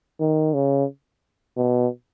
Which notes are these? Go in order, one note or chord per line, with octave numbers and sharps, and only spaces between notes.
D#3
C#3
B2